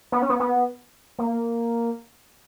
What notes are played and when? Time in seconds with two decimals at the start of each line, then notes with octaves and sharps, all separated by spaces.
0.12 B3
0.22 C#4
0.29 B3
0.40 B3
1.19 A#3